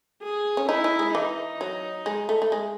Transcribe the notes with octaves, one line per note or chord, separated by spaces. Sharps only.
G#4
C#4
D#4 E4
D#4
G#3
E3 D#4
F#3
G#3
A3
A3
G#3